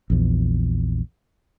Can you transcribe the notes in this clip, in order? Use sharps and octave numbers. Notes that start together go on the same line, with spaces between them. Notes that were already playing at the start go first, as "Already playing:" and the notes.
A#1 E2